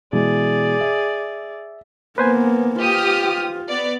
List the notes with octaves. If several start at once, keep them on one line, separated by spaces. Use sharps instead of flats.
B2 E3 G#3 G#4 D5
E5
A#3 B3 B4 C5 G#5
F4 G4 D#6 F6
B3 D5